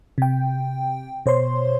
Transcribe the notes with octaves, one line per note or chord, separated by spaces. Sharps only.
C3 G5
B2 C5 C#5 C6